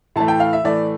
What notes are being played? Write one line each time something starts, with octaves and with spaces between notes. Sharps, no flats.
A2 E3 A3 A5
G5
F5
E5
A2 E3 A3 D5